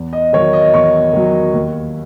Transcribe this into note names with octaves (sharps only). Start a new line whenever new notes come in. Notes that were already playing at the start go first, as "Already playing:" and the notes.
Already playing: E2
D#5
D#3 F#3 C#5
D#5
E2 C#6
D#3 F#3
D#2